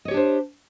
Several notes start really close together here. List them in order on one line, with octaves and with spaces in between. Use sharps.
D#5 C#5 G4 D4 C5